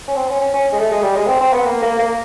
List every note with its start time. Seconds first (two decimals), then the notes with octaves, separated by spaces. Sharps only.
0.08 C#4
0.15 C4
0.29 C#4
0.40 C#4
0.53 C#4
0.72 G#3
0.79 A3
0.91 G#3
1.03 G3
1.15 G#3
1.28 C4
1.40 C4
1.53 B3
1.66 A#3
1.82 A#3
1.99 A#3